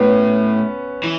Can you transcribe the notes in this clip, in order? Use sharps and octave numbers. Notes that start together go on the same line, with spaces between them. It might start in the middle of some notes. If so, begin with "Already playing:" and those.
Already playing: A2 B3 C#4
E3